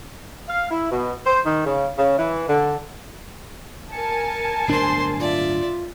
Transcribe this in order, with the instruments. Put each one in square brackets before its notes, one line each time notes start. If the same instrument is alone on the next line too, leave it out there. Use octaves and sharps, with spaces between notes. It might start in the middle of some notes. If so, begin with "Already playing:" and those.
[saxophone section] F5
E4
B2
C5
D#3
C#3
C#3
E3
D3
[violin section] A#4 G#5 A5 [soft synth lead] C#7
[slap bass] D1 G1 D4 [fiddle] C5 C6 [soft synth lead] C7
[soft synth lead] F4 [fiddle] D5 E5